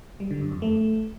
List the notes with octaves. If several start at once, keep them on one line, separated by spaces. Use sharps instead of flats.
G3
D3
F#2
F2
A3